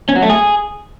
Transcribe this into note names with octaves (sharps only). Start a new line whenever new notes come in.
C#4
F#3
A3
G#4